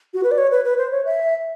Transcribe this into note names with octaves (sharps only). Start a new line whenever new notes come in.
F#4
B4
D5
C#5
B4
B4
C5
C#5
E5